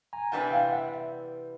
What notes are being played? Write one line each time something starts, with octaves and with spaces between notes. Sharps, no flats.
G#5 A#5
C3 E3 G3 B3 D4 F#5 G#5
G#5
F5 G5
E5 F#5